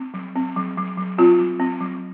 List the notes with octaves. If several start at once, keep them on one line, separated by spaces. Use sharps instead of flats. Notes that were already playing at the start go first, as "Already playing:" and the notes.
Already playing: C4
F#3
C4
F#3
F#3
F#3
C4 F4
F#3
C4
F#3